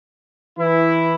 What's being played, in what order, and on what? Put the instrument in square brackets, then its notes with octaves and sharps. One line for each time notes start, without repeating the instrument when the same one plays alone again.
[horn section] E3 E4